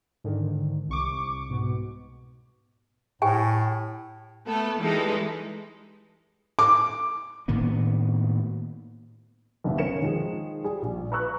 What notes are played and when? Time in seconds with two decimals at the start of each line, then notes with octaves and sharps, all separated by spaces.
0.24 G#2 D3 D#3
0.89 C2 C#6 D6
1.49 G#2 B2 B3
3.22 A2 G4 G5 G#5
4.47 A3 B3 A4
4.79 E3 G3 G#3 D#4 A4
6.59 D6
7.48 A2 D#3 A#3 B3
9.64 F#1 D#2 B3 E5
9.78 C#4 A#4 C#7 E7
10.02 D#3 F3 G#3
10.64 G3 G#4
10.82 A#1
11.12 B4 A#5 C#6 E6 F#6